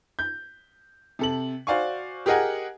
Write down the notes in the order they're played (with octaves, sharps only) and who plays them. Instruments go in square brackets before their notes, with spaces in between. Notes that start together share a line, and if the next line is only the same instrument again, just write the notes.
[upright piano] G6
C3 A4 F#7
F#4 C5 D5 F5 G#5 C#6
G4 G#4 A#4 D#5 F#5 G#5